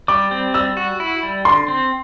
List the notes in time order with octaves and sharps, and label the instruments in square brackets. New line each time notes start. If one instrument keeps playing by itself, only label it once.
[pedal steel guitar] G3 [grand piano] D6
[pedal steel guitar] C4
[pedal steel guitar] G3 [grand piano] E6
[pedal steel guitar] F#4
E4
G3
[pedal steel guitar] D3 [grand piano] C6
[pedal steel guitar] C4